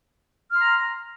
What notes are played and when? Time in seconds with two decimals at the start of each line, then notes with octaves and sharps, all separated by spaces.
0.50 F6
0.55 C6
0.60 A#5